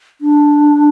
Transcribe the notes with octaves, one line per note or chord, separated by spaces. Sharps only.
D4